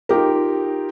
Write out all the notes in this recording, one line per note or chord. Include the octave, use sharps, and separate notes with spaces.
D#4 F4 G4 A#4